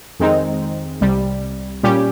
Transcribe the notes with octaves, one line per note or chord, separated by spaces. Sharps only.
F2 D#3 G#3 C4 D#4
C2 C3 G3
A#2 G3 C#4 G4